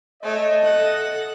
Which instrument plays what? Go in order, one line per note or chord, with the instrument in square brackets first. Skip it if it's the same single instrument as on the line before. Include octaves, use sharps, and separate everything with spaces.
[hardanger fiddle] A3 C#5 [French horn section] D#5
[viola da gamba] A4 [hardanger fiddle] F#5